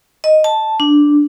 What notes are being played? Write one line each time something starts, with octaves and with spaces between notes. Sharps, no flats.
D#5
A5
D4